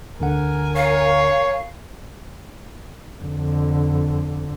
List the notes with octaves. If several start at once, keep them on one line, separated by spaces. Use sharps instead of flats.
D2 D3 A#4 F#5 G#5
C#5 F5
F2 D3